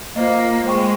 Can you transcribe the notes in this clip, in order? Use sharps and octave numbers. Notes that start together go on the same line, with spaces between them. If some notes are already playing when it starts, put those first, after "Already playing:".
A#3 F4 C5 D#5
G#3 C5 G5 C#6